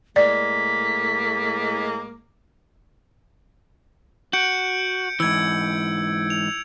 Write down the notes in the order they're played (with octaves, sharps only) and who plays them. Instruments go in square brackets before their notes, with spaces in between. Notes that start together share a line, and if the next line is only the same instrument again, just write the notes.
[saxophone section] A2 G#3 A#3 [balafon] D5 [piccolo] B6
[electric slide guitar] F#4 [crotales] G6 C#7 D7
[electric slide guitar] G#2 E3 [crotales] E6 G#6
[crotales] F7